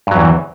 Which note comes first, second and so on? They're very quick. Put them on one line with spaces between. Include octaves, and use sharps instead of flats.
G2 F#3 E2 E3